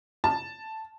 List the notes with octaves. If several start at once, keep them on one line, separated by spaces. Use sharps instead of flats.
A5